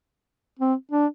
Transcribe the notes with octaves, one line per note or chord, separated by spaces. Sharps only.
C4
D4